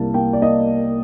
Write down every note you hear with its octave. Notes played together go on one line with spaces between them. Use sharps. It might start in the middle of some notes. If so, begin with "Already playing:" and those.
Already playing: C2 G3 A#3 A5
A#3 G5
D5
A#3 D#5